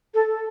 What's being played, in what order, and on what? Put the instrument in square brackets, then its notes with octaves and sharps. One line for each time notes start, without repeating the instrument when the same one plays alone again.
[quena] A4